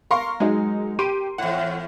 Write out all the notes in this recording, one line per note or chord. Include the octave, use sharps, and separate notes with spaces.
A#4 F5 C6 C#6
F#3 G#3 D#4
G4 C6 D7 D#7
E2 A2 F#5